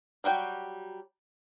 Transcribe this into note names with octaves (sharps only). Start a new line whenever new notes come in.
F#3 G3 F#4 G5